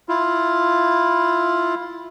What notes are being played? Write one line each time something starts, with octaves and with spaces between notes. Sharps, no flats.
E4 F4